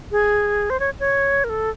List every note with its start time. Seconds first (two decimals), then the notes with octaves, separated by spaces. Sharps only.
0.12 G#4
0.70 C5
0.80 C#5
1.00 C#5
1.44 A#4
1.49 A4